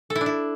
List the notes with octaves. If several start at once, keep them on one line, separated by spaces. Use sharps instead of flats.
A4
E4
D4
E4